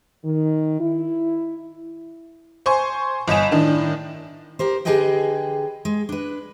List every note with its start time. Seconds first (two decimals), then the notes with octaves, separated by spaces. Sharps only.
0.24 D#3
0.80 E4
2.66 C5 G#5 C6 C#6
3.28 G1 D#5 G#5 E7
3.51 A2 D#3 D4
4.59 G4 A#4 C5
4.85 D3 G4 G#4 B4 D#5 G5
5.85 G#3
6.09 D4 B4